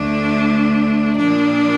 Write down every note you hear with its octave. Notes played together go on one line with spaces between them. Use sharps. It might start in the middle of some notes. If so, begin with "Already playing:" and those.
Already playing: D2 D3 A3 D4
A#2 F3 A#3 D4